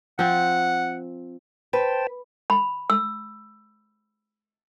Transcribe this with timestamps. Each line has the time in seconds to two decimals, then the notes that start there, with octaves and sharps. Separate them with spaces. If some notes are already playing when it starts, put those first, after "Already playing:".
0.19 F3 C4 F#5
1.73 B4 C5 G5 A5
2.50 B5
2.90 E6